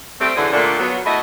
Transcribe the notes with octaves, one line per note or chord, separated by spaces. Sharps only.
G3 A3 C4
F#2 D3 E3 G#4
A#2 D3 A3 D4
F#3 B3
A3 E4 F#4 D#5